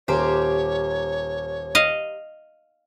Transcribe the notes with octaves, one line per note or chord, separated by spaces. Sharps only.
D#1 G4 A#4 C5 C#5
D#5 F5